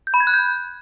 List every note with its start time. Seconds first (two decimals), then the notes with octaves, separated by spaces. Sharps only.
0.07 G6
0.14 B5
0.20 G#6
0.27 F#6
0.34 G6